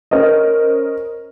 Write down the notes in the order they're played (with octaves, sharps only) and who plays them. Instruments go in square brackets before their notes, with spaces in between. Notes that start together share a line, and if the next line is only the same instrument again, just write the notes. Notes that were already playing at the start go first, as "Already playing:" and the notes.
[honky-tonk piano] C#4 A#4 C5 D#5